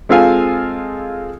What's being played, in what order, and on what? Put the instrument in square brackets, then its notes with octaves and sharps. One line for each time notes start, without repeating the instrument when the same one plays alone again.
[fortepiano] G#3 C4 F4 A4 F5 G#5